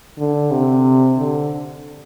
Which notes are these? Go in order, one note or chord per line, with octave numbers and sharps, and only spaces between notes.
D3
C3
D3